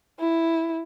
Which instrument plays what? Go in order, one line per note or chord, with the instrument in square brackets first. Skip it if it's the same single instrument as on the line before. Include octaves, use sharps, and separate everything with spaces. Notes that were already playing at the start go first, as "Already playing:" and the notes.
[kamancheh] E4